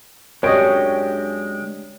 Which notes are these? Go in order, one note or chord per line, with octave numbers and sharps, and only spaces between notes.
F#2 G#3 C4 D4 G4 C#5 D#5 G5